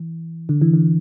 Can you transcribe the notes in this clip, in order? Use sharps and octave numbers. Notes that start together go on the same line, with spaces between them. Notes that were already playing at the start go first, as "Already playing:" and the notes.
Already playing: E3
D3
E3
D3